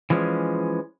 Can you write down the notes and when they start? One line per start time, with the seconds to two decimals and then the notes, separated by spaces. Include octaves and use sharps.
0.10 E3 F3 G#3 C#4